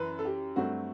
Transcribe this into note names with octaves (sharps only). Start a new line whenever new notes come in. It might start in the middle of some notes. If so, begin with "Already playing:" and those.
Already playing: F#2 E3 B4
A4
G4
G2 F#3 A3 C4 F#4